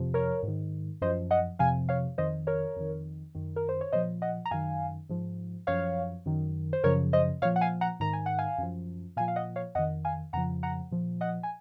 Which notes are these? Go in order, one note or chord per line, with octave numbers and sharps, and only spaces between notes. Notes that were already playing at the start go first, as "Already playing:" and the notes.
Already playing: F2 C3 F3
A#4 C#5
G#2
D#3
F#2 F3 C5 D#5
D#5 F#5
F2 C3 F3 F5 G#5
C#5 F5
F2 D#3 C5 D#5
A#4 C#5
F2 D#3
F#2 D#3
A#4
C5
C#5
A#2 F3 C5 D#5
D#5 F#5
A#5
F#2 D#3 F5 G#5
G#2 F3
F#2 F3 C#5 F5
F#2 D#3
C5
F#2 C#3 F3 A#4 C#5
C5 D#5
A#2 F3 C#5 F5
F#5
F5 G#5
F#5 A#5
G#2 D#3 A#5
G#5
F#5
F5 G#5
F#2 F3
A#2 F3 F5 G#5
F5
D#5 F#5
C#5 F5
F2 D#3 D#5 F#5
F5 G#5
F2 C#3 F3 F#5 A#5
F#5 A#5
A#2 F3
D#5 F#5
G#5